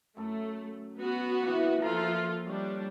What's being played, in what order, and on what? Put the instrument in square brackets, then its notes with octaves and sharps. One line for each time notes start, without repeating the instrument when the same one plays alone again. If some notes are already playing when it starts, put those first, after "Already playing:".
[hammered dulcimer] F#2 A4 [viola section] A3
[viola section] B3 F#4
[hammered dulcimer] A#2 E3
[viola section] F3 F4 A4 [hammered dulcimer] E5 A#5
[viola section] G3 D4 [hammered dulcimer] C#5 D#5